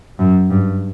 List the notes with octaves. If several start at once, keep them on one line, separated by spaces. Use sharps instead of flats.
F#2
G2